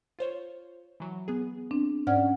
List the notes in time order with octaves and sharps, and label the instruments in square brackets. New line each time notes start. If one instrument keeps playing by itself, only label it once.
[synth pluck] F4 C5 C#5
E3 F#3
B3 G#4
[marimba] C4 D4
[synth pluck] G#2 C#4 [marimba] D5 F#5 F6